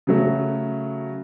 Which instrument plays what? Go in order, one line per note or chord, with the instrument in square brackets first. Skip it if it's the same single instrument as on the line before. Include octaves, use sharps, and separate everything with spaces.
[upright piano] C#3 F#3 A3